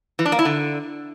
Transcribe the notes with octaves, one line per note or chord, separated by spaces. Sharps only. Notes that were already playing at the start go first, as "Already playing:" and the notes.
E3
D4
A#3
E4
D3